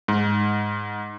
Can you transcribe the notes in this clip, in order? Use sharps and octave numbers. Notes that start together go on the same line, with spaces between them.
G#2